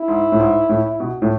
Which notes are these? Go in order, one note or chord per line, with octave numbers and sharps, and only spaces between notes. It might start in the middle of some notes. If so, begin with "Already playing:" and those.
Already playing: E4
G#2
A2
G#2
A2
B2
A2